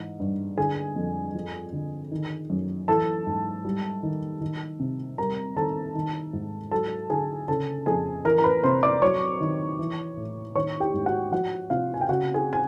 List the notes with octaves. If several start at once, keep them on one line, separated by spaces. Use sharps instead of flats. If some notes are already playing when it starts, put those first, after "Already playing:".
Already playing: G#2 E3
G2
D3 G#4 G#5
F2
F3
D3
D#3
F#2
E3 A4 A5
G#2
G3
D#3
D#3
C3
G3 A#4 A#5
D#3 A4 A5
D#3
G#2
F#3 A4 A5
D3 G#4 G#5
C#3 A4 A5
F2 G#4 G#5
E3 A#4 A#5
A#5
B4 B5
C3 C5 C6
D5 D6
F#3 C#5 C#6
D#3
E3
A2
D#3 C#5 C#6
G4 G5
G#2
F#4 F#5
F3 F#4 F#5
C3 F4 F5
G#5
G5
C#3 F#4 F#5
G#4 G#5
G#5